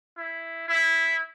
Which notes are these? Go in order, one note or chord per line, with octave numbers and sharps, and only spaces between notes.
E4
E4